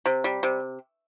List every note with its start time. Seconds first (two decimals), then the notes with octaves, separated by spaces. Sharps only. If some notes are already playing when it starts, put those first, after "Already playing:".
0.06 C3
0.24 G3
0.43 C3